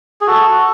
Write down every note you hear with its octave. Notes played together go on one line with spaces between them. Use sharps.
G#4
F#4 A4
F#4